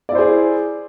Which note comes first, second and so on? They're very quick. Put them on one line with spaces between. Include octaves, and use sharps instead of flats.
D5 E4 C5 G#4